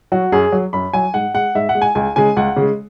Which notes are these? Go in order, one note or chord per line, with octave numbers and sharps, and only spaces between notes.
F#3 F#4
F#2 G#4
F#3
F#2 B5
F#3 G#5
G#2 F#5
G#3 F#5
G#2 E5
F#5
G#3
G#5
C#2 G#5
C#3 G#3 G#5
C#2 F#5
C#3 G#3